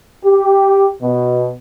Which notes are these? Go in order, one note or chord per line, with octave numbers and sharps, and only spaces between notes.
G4
B2